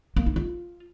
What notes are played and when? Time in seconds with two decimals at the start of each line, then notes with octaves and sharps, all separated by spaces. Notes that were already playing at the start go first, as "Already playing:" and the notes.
0.16 A#3
0.26 D#4
0.36 F4